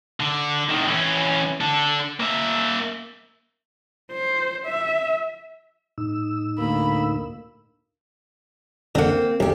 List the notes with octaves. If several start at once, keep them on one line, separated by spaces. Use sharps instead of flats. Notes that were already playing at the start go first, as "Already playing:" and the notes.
D3
A2 D#3
E3 C#4
D4 A4
A#3 E5
C5
E5
A2 D#4 E6
D2 A#3 B5
D3 A#3 C4 F#5
B1 F2 G4